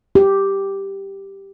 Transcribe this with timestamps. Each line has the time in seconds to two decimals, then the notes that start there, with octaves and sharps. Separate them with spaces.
0.15 G4